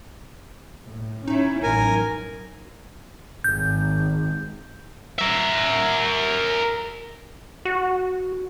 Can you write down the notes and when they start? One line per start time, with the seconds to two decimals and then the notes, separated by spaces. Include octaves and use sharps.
0.85 A2
1.27 C#4 D#4 E4
1.63 A1 F#2 A#4 G#5
3.44 G#1 G6
5.18 A#4 E5
7.65 F#4